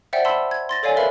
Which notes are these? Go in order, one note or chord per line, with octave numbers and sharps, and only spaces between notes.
C5 D5 E5 F#5 G5
A5 B5 C6 E6 B6
G#6
C6 A6 A#6
A4 C#5 D5 F5 G#5
A#4 B4 E5 F5 B5